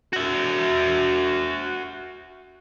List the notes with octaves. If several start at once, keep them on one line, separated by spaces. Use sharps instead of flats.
F#4 E5